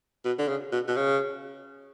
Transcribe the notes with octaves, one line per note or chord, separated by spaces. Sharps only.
B2
D3
C#3
B2
B2
C#3